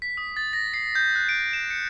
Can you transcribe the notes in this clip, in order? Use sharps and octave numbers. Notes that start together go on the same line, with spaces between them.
B6
D#6
A6
A#6
C7
G6
F#6
D7
E7
C#7